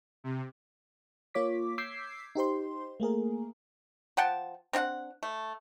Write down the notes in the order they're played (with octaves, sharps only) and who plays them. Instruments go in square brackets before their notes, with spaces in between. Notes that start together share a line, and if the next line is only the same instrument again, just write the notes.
[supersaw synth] C3
[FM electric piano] A#3 F4 C#5 D6 B6
D6 E6 G6 G#6 B6 C7
D#4 G4 C5 C6
A3 A#3 G#4 A#4
[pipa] F3 F#5 G5 A5
C4 D4 F5 F#5
A3